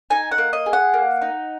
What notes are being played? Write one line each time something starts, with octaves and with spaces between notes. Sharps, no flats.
D#4 G#5
F#5
A#3
D#5
G#4
F#5
A#3
D#4